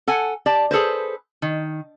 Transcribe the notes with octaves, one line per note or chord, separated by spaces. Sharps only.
A4 F#5 G#5
G4 D5 A5
G#4 A4 B4 C5
D#3